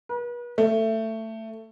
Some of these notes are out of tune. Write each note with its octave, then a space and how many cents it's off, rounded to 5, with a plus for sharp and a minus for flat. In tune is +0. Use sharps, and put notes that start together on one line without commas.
B4 -40
A3 +15